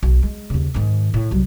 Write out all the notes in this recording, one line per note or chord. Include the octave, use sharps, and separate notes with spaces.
B1
G#3
D#2 C#3
G#2 D#3
A2
C2 F#3